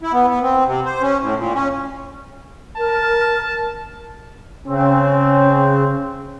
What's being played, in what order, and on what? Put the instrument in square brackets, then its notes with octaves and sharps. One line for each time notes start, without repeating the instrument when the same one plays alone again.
[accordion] E4
B3
B3
C4
C3
C5
C#4
A2
A#2
C#4
[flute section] A#4 [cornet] A5
[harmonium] C#3 [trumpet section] C4 [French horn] C#4